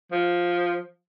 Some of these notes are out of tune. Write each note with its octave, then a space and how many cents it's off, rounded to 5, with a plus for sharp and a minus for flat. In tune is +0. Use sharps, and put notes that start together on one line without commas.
F3 +5